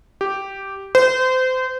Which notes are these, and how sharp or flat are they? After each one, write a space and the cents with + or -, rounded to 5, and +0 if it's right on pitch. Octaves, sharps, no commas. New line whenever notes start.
G4 -5
C5 -30